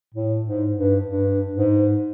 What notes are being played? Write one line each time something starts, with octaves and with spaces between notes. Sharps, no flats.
A2
G#2
G2
G2
G#2